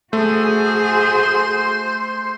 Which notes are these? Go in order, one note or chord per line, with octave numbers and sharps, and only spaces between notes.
A3 F#4 G#4 C5